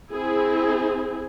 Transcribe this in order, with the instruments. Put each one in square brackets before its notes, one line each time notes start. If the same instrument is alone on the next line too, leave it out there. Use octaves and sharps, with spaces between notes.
[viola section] C4 E4 G#4